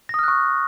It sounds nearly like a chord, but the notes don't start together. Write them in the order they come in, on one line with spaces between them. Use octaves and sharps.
A#6 D#6 F6 F#6 C#6